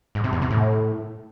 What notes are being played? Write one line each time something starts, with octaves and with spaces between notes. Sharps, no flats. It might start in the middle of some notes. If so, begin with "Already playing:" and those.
G#2
C3
E2
C3
A2